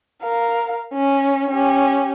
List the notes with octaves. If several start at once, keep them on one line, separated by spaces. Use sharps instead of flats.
A#4 F5
C#4
C#4 G4